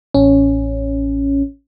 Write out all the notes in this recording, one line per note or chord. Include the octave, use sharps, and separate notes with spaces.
A1 C#4